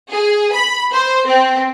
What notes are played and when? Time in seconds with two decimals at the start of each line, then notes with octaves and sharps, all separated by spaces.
0.12 G#4
0.53 B5
0.93 C5
1.26 C4